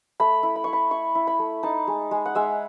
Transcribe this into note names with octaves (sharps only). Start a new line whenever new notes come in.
A3 B5
E4
B5
E4 C#6
B5
E4 C#6
E4
B5
A3
D#4 A5
G#3
G#3
F#5
G#3 E5